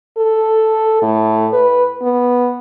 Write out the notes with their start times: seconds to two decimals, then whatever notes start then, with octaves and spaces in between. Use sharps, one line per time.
0.17 A4
1.02 A2
1.53 B4
2.02 B3